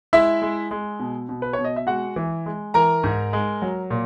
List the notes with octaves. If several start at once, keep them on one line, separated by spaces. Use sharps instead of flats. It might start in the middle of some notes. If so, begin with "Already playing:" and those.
G#3 E4 E5
G#3
G#3
B2
B2
B4
C#5
B2
D#5
E5
G#3 F#4 F#5
E3
G#3
E3 A#4 A#5
G#2
G#3
F#3
A#2